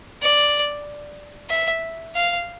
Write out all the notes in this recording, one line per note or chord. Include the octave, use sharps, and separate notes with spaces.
D5
E5
F5